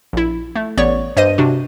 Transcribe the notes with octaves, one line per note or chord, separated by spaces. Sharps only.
A#1 E4
A3
A1 B3 C#5 D5 C#6
G2 C5 D#5 D#7
C3 D4 F#4